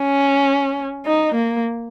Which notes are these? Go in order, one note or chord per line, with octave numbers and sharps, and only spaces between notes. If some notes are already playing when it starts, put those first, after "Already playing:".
Already playing: C#4
D#4
A#3